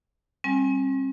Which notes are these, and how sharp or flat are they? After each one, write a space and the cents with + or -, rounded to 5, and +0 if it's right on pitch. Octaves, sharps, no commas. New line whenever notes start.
G3 +0 C4 +40 G#5 +0